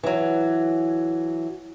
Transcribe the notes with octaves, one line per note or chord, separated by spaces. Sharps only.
E3 F#3